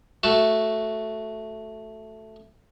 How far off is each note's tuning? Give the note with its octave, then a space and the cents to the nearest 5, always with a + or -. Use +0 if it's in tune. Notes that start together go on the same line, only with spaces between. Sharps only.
A3 +0 F#4 +0 A5 +0